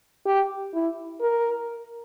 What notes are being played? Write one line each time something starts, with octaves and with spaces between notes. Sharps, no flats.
G4
E4
A#4